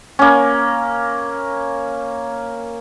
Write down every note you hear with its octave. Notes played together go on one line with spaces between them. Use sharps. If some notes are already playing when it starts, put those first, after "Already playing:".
A#3 C#4